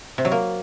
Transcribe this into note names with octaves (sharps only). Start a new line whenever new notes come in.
C3
F#3
A#3